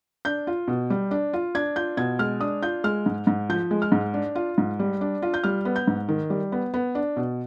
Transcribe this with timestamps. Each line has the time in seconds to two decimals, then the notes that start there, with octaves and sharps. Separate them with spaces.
0.25 D4 G6
0.47 F4
0.68 B2
0.90 G3
1.11 D4
1.33 F4
1.55 D4 G#6
1.76 F4 G6
1.97 B2 G#6
2.19 G#3 F6
2.40 D4 D#6
2.63 F4 G6
2.84 G#3 F6
3.06 G#2
3.27 G#2
3.49 F3 G6
3.71 G#3
3.82 F6
3.92 G#2
4.14 D4
4.35 F4
4.58 G#2
4.79 G3
5.01 D4
5.22 F4
5.34 G6
5.44 G3 F6
5.65 B3
5.76 G6
5.87 G#2
6.09 D#3
6.30 G3
6.52 B3
6.74 B3
6.95 D4
7.16 B2